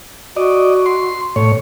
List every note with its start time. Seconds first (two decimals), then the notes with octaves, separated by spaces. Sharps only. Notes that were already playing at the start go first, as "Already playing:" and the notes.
0.37 F#4 D5 D#5
0.86 C6
1.36 A2 C#5